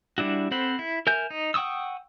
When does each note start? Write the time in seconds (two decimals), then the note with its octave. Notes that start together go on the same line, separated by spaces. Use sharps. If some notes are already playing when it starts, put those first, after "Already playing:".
0.18 G3 D4 E4 F#4
0.51 C4 A4 C5 F#5 B5
0.79 E4
1.07 A#4 E5 G#5 G6
1.30 D#4
1.54 F#5 G5 C#6 D#6 E6